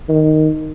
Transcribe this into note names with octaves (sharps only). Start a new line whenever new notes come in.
D#3